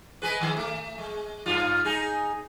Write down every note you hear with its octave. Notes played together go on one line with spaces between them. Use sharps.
G#3 G#4 B4
D#3 G#3
A3
G#3
G2 F4
D#4 G#4